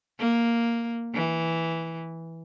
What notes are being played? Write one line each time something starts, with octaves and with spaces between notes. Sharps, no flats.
A#3
E3